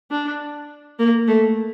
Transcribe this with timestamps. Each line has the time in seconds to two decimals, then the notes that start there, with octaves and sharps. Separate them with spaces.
0.11 D4
0.99 A#3
1.27 A3